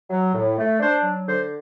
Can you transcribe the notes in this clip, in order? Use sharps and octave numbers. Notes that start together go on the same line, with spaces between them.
F#3
A2
A3
D4 C5
F#3
D3 C5